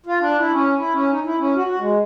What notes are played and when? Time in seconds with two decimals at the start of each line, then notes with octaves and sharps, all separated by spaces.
0.06 F4
0.20 D4
0.39 E4
0.52 C#4
0.78 E4
0.94 C#4
1.10 D#4
1.25 E4
1.40 C#4
1.56 F#4
1.67 F#4
1.79 G#3